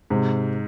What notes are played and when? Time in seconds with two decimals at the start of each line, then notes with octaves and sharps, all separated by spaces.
0.10 G#2 C3